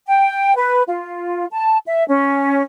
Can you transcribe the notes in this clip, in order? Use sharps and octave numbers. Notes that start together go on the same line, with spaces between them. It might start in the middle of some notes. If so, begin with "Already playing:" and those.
G5
B4
F4
A5
E5
C#4